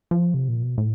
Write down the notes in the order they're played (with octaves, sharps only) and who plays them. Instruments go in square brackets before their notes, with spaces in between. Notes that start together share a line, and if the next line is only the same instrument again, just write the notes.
[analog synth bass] F3
C3
A#2
B2
A2